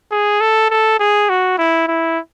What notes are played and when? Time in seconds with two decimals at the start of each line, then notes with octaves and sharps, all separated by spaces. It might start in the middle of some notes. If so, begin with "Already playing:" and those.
0.11 G#4
0.40 A4
0.70 A4
1.00 G#4
1.29 F#4
1.58 E4
1.88 E4